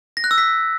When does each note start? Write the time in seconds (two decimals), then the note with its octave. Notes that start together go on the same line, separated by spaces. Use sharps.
0.17 A#6
0.24 F#6
0.31 E6
0.38 B6